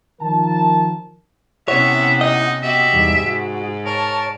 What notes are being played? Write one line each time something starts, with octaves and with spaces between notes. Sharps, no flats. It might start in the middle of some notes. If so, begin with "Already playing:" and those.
D#3 F3 A#4 A5
C3 B3 C#4 E4 C#5 E5 F#5
D#4 D#5
B3 F#4 G4 E5
E2 G#2 G3 D#4
F#4
A#4 C#5 A5